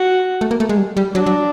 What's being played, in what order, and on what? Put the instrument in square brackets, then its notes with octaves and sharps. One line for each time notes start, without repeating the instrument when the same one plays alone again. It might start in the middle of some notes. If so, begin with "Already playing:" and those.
Already playing: [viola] F#4
[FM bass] A3
A#3
A3
G#3
G3
G3
[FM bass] F#3 [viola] D4
[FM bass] F#3